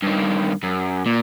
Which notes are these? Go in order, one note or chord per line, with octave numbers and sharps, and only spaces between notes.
G2 D#3
F#2
A#2